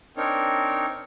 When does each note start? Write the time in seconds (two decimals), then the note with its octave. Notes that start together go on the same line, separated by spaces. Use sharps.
0.17 C4 D4 D#4 A#4 C#5